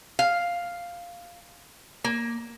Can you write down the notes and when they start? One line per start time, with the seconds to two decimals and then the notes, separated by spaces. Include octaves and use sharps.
0.19 F5
2.04 A#3